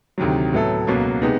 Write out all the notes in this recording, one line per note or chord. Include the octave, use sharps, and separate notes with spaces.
D2 C3 D#3 F#3
A2 F#3 B3 E4 A4
C#2 B2 F#3 A#3
C3 G#3 B3 D#4